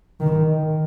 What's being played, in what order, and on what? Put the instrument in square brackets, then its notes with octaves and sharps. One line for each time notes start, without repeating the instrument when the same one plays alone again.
[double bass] D#3